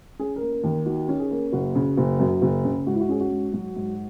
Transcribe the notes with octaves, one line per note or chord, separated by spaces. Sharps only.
C#4 G#4
A#3 A#4
A#4
D#2 A#4
D#3 F#4
C#4
G#4
A#3
F#1 F#4
C#3
F#1
F#2
F#1
C#3
G#2 F#4
E4
F#4
C#4 G#4
F#4
G#2
F#3
G#2